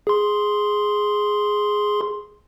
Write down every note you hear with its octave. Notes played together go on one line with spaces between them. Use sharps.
G#4 C6